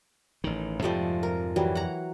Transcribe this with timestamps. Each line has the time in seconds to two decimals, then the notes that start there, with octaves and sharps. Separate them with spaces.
0.44 A1 D#3
0.82 F2 G#2 C3 F3 G3 A3
1.23 A#4
1.56 E3 F#3 G3
1.75 F#5 A#5